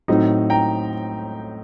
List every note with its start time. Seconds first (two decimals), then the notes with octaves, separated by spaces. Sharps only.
0.08 A2 F#3 C4 D#4
0.50 G5 A#5